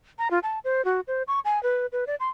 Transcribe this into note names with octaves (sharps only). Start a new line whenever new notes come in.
A#5
F4
A5
C5
F#4
C5
C#6
G#5
B4
B4
D5
C6